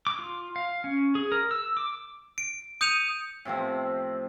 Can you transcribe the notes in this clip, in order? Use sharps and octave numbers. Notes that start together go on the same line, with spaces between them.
D6
F4
F5
C#4
G#4
A#4
E6
D6
D7
D#6 G6 C#7 D#7 F7
A2 C3 F3 C4